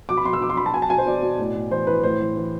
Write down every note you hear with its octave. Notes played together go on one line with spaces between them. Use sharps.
B2 D6
B5
B2 C6
E6
B2 D6
C6
B2 B5
A5
B2 G#5
A5
B2 G#5
C5
B2 D5
B2
A2
A2
E3 C5
E3 B4
A2 C5
E3
E3